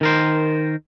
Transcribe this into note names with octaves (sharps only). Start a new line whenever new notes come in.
D#3 A#4 C5